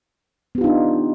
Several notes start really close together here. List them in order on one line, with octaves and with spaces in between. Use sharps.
B3 G4 F4 D#4 D4